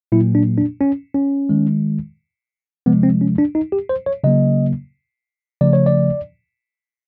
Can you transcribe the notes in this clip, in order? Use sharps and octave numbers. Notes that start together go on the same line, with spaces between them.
A#2 F#3 A#3 E4
D4
D4
C#4
C#4
D#3 G#3
C3 F3 G#3 B3
C4
C#4
D4
D#4
G4
C5
C#5
C#3 F#3 A#3 D#5
C#3 F3 A3 D5
C#5
D5